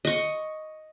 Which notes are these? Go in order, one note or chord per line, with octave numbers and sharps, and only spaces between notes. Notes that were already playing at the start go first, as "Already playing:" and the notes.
D#5 C#6